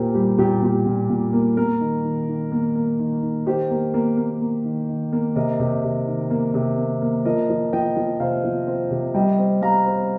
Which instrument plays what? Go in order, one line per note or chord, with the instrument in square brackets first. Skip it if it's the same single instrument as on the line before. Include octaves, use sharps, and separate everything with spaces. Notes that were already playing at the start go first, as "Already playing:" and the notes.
Already playing: [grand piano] A#2 A#3 G4 A#4 C5
G3 G4
A#2 G4
A#2 G4
A#2
A#2
A#3
A#3 A#4
D#3
D#3
D#3
A#3
A#3
D#3
D#3
D#3 G4 C5
A#3
A#3
A#3
A#3
D#3
D#3
A#3
C3 A#4 D#5
C3
C3
D#3
A#3
C3
A#3
A#3
F3 A#4 D#5
F3
F3 D#5 G5
F3
C3 C5 F5
F3
C4
C3
G3 D#5 G5
C4
G3 F5 A#5
C4